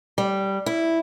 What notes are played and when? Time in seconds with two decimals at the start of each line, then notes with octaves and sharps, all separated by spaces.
0.18 G3
0.66 E4